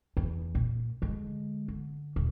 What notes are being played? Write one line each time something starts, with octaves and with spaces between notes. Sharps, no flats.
E2
A#2
D3 G#3
D3
D#1